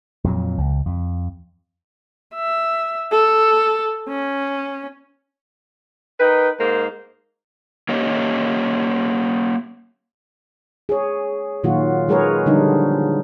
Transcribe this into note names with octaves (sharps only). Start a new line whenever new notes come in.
F2 A#2 F#3
C#2
F2
E5
A4
C#4
D#4 A#4 B4 G5
G#2 A#3 A#4 C5
A#3 C#4 G4 C#5 D#5
G#4 C#5
A#2 D#3 F#3 F4 F#4
F#3 G#3 G#4 A#4 B4 C#5
D3 F3 G3 D4 D#4